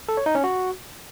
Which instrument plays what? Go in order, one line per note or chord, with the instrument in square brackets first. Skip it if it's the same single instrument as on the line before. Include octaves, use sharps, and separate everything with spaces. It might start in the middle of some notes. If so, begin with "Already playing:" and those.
[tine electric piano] A4
C#5
D#4
C#4
F#4